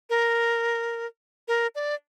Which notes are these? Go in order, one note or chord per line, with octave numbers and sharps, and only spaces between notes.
A#4
A#4
D5